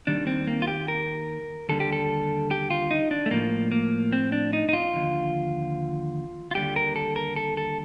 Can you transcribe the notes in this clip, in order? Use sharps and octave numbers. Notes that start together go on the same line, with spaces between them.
D#2 D#3 G3 D4
C4
A#3
F4
G4
A#4
D#2 D3 G3 A4
G4
A4
G4
F4
D#4
D4
A3
A2 F3 A#3
A#3
C4
D4
D#4
D#4
F4
D#2 D3 F3
F4
D#2 D3 G3 G4
A#4
A4
A#4
A4
A4